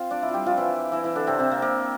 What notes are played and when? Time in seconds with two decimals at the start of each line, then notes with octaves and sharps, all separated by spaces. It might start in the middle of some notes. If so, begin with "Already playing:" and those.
Already playing: C4 F4 C5 F5
0.11 D4 D5
0.23 E4 E5
0.28 F4
0.34 G3 G4
0.46 F3 F4
0.57 E3 E4
0.92 E3 E4
1.04 E3 E4
1.15 D3 D4
1.27 C3 C4
1.39 C3 C4
1.52 A#3
1.62 A#3